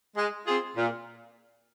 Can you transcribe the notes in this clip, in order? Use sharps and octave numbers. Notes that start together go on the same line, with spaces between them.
G#3
C4 F4 G#4
A#2